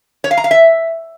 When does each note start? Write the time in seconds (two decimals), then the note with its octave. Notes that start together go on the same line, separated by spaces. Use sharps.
0.24 C#5
0.31 F5
0.37 A#5
0.44 F5
0.51 E5